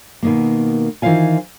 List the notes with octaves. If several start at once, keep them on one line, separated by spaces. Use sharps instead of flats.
B2 D#3 A#3
D#3 E3 F4 C5 F5 G#5